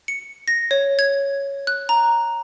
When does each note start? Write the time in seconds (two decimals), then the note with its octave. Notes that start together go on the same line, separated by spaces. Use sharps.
0.08 C#7
0.48 A#6
0.71 C#5
0.99 G#6
1.67 F#6
1.89 A#5